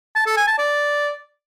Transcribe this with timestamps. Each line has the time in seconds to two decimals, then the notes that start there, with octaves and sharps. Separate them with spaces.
0.15 A5
0.26 A4
0.37 G#5
0.47 A5
0.58 D5